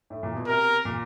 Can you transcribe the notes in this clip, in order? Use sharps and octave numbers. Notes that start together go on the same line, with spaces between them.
A2
A#2
B2
C3 A#4
A#2